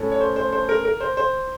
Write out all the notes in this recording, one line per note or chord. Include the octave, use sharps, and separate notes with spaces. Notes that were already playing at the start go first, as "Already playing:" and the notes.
Already playing: A2 A3 C#4
C#5
C5
C5
C5
A#4
A#4
C5
C5